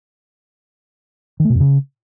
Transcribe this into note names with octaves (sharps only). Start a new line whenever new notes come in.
D#3
A3
B2
F2
C#3